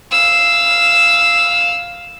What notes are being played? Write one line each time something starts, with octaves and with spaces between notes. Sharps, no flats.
F5 E6